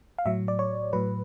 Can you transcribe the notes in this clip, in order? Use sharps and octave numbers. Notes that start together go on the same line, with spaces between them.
F5
A2 F#3 E5
D5
C#5
A2 F#3 B4